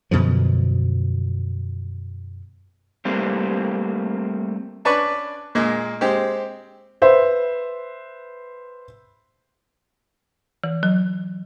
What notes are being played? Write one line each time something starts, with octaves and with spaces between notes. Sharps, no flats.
F#2 B2 D3 F3
G3 A3 A#3 C4
C#4 D4 B4 D5 C#6
A#2 G#3 A#3
G#3 C4 G4
B4 C5 E5
E3
F#3